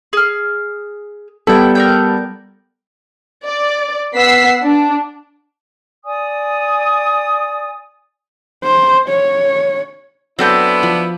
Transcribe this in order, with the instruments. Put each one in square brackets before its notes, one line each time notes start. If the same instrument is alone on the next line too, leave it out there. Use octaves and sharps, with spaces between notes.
[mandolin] G#4 F6
[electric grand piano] G3 B3 A4 [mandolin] E4 G5
[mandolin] A#4 D5 G5
[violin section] D5
B3 F#5 E6 B6 C7
D4
[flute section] D5 G#5 D#6
[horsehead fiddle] C5
C#5
[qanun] F#3 [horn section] B3 D4 E4 [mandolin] C4 A4 G6
[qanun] F3